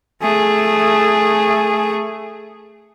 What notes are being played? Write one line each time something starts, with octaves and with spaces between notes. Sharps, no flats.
A3 G#4